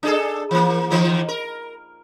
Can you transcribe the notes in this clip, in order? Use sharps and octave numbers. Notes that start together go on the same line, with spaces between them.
D4 G#4 A4
E3 A#3
D#3 E3 A#3
A#4